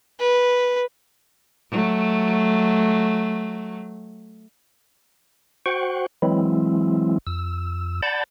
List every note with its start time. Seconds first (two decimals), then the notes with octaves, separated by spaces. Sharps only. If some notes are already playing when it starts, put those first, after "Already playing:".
0.20 B4
1.71 F#3 A3
5.66 F#4 C5 F#5 G5 C#6
6.22 E3 F#3 G#3 C4 E4
7.27 F2 E6
8.02 D5 F#5 A5 B5 G6 A6